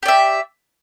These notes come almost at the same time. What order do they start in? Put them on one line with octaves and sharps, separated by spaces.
G4 D5 E5